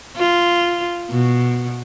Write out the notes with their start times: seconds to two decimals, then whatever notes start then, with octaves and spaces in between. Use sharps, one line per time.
0.16 F4
1.10 B2